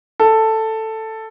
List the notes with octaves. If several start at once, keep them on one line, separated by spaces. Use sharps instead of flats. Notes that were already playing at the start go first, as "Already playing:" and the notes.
A4